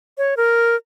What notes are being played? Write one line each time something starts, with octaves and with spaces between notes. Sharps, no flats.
C#5
A#4